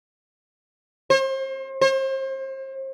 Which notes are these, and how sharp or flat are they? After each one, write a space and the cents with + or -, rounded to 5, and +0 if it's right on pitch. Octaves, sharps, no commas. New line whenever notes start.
C5 +35
C5 +35